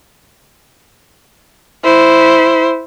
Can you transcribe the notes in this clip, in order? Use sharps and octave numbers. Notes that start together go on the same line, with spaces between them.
E4 C5